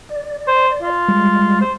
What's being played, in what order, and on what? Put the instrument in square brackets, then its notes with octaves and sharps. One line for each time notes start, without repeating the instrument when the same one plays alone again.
[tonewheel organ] D5
[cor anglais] C5
F4
[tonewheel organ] G3 G#3
[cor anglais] C5